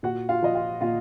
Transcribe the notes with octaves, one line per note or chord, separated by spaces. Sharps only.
A#2 F#4 F#5
F4 F5
F3 D#5
F4 F5
A#2 F4 F5